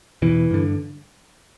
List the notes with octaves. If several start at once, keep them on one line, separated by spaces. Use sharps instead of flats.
E2 B2 E3
G2 D3